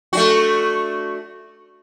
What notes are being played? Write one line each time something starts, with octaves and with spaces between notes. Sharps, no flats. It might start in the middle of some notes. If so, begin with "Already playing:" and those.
A3 D4 F#4